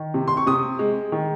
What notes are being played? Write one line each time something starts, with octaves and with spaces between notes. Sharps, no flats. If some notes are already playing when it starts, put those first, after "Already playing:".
Already playing: D#3
C3
C6
C#6
C3 D#6
G#3
D#3